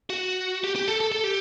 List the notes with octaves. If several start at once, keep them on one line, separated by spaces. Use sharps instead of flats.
F#4
G4
G4
A4
A4
A4
G4